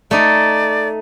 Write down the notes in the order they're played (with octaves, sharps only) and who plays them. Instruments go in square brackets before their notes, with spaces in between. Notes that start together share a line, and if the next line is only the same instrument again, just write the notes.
[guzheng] A3 D#4 [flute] D5